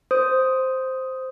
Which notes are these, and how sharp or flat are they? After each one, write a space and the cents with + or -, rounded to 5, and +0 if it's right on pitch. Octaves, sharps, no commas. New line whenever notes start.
C5 +0 D#6 +5